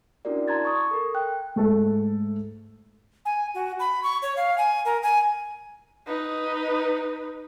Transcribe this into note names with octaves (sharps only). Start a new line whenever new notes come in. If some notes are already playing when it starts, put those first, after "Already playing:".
C#4 D4 E4 F#4 A#4 D5
A5 A#5 C6 G#6 A6
C#6 D#6
A4 A#4
G5 F#6
G#2 A3 A4
G#5
F#4
B5
C#6
C#5
F5
G#5
A#4
G#5
D#4 B4